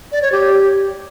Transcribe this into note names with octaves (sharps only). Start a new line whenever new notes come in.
D5
C#5
G4